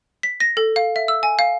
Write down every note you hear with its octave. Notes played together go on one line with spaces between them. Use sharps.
B6
A#6
A4
F5
E5
E6
G#5
F5